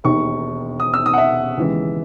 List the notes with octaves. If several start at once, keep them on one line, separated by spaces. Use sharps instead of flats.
E1 D#2 D#3 C#6
D#6
E6
D#6
F#5
E5
D#2 C#3 E3 G#3